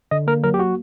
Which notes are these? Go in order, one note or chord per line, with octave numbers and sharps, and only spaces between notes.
D3 D#5
A#3 A#4
F#3 A#4
G4
A#3 F#4